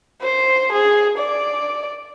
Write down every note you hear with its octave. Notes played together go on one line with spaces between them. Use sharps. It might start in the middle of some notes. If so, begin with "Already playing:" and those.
C5
G#4
D5